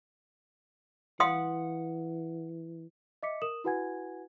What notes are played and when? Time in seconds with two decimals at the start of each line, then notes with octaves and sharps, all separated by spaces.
1.20 E3 F5 F#5 C6 D#6
3.23 D#5 E5 D6 B6 C#7
3.42 A#4 D#6 E7 F#7
3.64 E4 F#4 B4 F#5 G#5 G#6